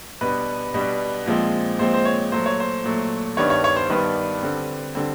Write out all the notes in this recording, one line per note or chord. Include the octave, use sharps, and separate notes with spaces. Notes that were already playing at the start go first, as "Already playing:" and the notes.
B2 G3 B3 D4 B4
B2 G3 B3 D4
A#2 F3 G#3 C4
A#2 F3 G#3 C4 C5
C5
C#5
A#2 F#3 A3 C5
C#5
C5
A#2 F#3 A3
G2 D#3 G3 B3 D4 C#5
C#5
C#5
C5
G2 D#3 G3 B3 D4 B4
D3 G3 C4
D3 G3 C4